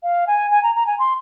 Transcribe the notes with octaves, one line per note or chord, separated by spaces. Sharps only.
F5
G#5
G#5
A#5
A#5
G#5
C6